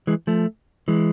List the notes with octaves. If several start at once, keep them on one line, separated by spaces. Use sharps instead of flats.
E3 G#3
F3 A3
E3 G#3